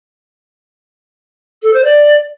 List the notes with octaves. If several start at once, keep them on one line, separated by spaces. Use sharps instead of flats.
A4
C5
D5